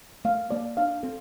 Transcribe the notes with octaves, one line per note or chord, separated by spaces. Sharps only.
A3 F5
A#3 D5
D4 F5
C4 A4